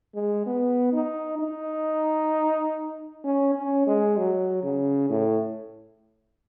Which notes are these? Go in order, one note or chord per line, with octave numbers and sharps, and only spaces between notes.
G#3
B3
D#4
D#4
C#4
C#4
G#3
F#3
C#3
A2